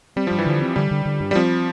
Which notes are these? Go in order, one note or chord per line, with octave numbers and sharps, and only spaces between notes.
G3 C4
G2 F3
E3
D3 F3
C4
D3 G3
D3
D3
G2
G3
F3 C4